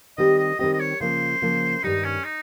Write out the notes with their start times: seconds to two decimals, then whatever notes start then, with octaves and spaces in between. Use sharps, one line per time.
0.18 D#3 G3 C4 G4 D#5
0.39 D#5
0.59 D#3 G3 C4 G4 D#5
0.74 D#5
0.80 C#5
1.00 C#3 F3 A#3 F4 C5
1.42 C#3 F3 A#3 F4
1.84 G2 D#3 G3 D#4
2.05 C#4
2.25 D#4